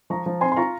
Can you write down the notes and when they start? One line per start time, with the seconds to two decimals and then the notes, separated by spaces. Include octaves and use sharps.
0.10 F3 A#5 C#6
0.26 F3
0.41 C4 G#5 C6
0.52 C6
0.56 F4 A#5 C#6